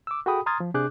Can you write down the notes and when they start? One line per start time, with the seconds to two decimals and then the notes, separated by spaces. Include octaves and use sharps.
0.07 D6 E6
0.26 F#4 G#4 A4 G5 B5 D#6
0.46 A#5 C6 D#6 F6 G#6 A6
0.60 F3
0.74 C3 D4 G#4 D6 F#6 G6